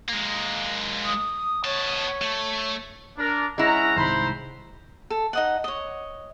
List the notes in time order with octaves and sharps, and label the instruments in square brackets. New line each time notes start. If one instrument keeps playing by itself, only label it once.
[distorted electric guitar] G#3 A#3
[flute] D#6
[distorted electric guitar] B3 A5 [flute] C#5
[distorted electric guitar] A3
[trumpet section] D4 A#4
[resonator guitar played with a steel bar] G#3 E4 [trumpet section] C#4 F#5 A#5
[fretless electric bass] C2 G#2 D#3 [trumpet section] C5 A#5 B5
[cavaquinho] A4
D#4 D#5 F#5
C#5 D#5